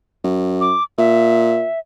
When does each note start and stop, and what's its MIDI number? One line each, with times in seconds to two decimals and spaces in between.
0.24 0.74 42
0.61 0.83 86
0.98 1.66 46
0.98 1.79 76